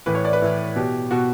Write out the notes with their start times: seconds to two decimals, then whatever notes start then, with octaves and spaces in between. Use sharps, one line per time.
0.06 A2 E3 B4
0.15 C#5
0.25 D5
0.33 B4
0.42 A2 E3
0.76 B2 G4
1.11 B2 F#4